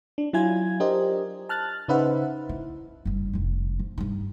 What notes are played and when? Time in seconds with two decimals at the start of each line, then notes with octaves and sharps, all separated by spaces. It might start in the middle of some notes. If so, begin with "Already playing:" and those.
0.18 D4
0.33 F#3 E4 F4 G#5 G#6
0.80 D4 G4 A#4 C5 D#5
1.49 A5 F6 F#6 A6
1.88 C#3 D#4 B4 C5 E5 F#5
2.49 E4
3.05 F#1 G2
3.33 F1 D4
3.79 F3
3.98 G2 D#4